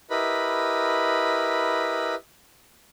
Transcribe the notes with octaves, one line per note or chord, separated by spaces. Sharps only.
E4 G4 A#4 B4 D#5 B5